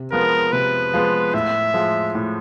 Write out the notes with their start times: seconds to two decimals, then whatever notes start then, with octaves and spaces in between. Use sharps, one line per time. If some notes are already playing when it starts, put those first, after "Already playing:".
Already playing: C3
0.12 F3 G#3 B3 A#4
0.52 C3 B4
0.94 F3 G#3 B3
1.34 A2 E5
1.74 F3 G#3
2.15 A2